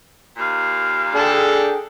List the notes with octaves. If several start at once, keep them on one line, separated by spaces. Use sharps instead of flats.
D#2 A#2 F5
D4 G#4 A4 G5